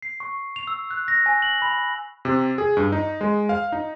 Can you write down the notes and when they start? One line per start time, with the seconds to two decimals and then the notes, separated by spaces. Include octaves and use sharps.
0.02 C7
0.20 C#6
0.56 F7
0.67 E6
0.91 F#6
1.08 A#6
1.26 G#5
1.42 F#7
1.62 B5
2.25 C3
2.58 G#4
2.77 G2
2.92 D#4
3.21 G#3
3.49 F5
3.72 D#4